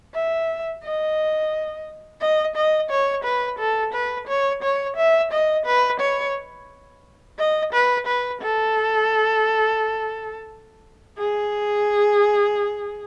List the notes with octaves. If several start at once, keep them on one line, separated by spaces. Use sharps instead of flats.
E5
D#5
D#5
D#5
C#5
B4
A4
B4
C#5
C#5
E5
D#5
B4
C#5
D#5
B4
B4
A4
G#4